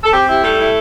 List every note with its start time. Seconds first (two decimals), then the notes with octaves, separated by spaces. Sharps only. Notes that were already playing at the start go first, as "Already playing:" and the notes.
0.03 A4
0.13 C4 G4
0.28 E4 G4
0.43 G3 A3 A4
0.58 E4